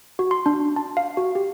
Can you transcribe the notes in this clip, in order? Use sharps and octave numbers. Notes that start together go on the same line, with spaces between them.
F#4
C6
D4
A5
F5
F#4
G4